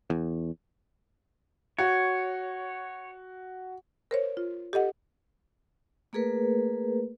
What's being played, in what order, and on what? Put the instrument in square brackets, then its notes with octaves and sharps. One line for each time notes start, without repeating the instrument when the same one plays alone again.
[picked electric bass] E2
[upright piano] F#4 [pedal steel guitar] C#5
[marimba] A#4 C5 C#5
F4
G4 A4 D#5 F#5
[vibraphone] A3 A#3 G#4 A#4 B4